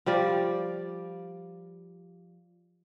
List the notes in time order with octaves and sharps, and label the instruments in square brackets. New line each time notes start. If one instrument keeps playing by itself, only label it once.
[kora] F3 G3 D5